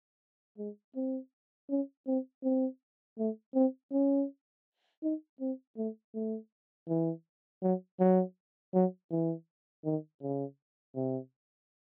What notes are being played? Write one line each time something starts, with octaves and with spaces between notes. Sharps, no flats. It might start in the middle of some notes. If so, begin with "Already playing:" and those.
G#3
C4
C#4
C4
C4
A3
C4
C#4
D#4
C4
A3
A3
E3
F#3
F#3
F#3
E3
D#3
C#3
C3